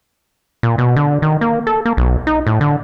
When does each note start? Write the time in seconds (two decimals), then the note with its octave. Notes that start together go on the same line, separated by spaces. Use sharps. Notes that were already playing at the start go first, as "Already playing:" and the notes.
0.63 A#2
0.78 B2
0.96 D3
1.22 D#3
1.41 A#3
1.67 A4
1.85 A#3
1.97 B1
2.27 D#4
2.47 A2
2.61 D3